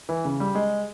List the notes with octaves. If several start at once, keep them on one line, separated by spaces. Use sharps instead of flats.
E3
C#3
G3
G#3